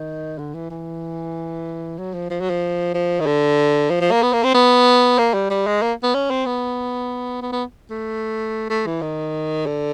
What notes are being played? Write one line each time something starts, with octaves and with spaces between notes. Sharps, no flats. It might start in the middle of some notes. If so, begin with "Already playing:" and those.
Already playing: D#3
D3
E3
E3
F#3
F3
F3
F#3
F3
F3
D#3
D3
F3
F3
A#3
B3
A#3
C4
B3
A#3
G3
G3
G#3
A#3
B3
C#4
C4
B3
B3
B3
A3
A3
E3
D#3
D3